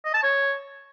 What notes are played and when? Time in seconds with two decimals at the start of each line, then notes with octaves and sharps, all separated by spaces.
0.05 D#5
0.14 A5
0.23 C#5